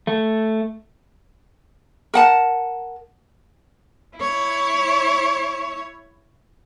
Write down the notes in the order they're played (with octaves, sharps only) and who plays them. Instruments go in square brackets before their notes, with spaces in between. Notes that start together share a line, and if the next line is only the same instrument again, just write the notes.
[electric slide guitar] A3
[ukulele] A#4 F#5 A5
[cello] E4 C#5